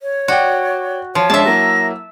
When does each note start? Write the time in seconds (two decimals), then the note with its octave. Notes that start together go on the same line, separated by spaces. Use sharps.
0.01 C#5
0.28 F#4 D5 G5
1.15 F3 C#5
1.30 G#3 C#4 D4 E5 A5
1.45 F#3 A#3 E4 A#6